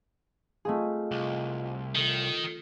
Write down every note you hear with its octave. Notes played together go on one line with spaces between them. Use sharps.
A3 C4 F4 G#4 D#5 F5
C2
D#3 F4 A4